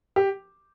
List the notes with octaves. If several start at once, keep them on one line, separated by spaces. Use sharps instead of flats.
G4